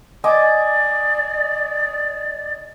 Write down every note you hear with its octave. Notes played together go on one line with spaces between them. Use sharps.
D5 D#5 G#5 D6